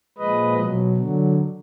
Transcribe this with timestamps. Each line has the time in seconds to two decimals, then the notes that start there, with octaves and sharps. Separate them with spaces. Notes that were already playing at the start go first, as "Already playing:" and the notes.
0.18 A#2 F3 G#3 B4 D#5
0.57 B2 F#3
0.97 D3 F#3